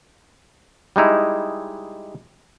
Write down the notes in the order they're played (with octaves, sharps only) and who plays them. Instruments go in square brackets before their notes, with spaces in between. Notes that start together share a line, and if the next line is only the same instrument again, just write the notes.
[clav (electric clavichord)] G3 G#3 D#4 E4